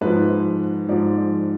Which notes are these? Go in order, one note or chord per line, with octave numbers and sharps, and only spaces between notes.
G#2 F3 B4
G#2 F3 D5